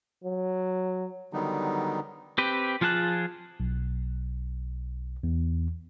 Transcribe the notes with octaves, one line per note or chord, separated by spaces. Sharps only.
F#3
D3 D#3 F#3 G3 B3 D#4
C4 G4 B4
F3 F4 G#4 A5 F#6
B1
E2